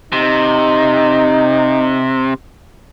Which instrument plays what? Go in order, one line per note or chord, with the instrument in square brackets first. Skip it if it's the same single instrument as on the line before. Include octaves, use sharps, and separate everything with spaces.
[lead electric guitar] C3 [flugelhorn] D#4